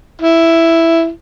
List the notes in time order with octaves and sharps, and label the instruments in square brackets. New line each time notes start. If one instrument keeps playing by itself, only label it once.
[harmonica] E4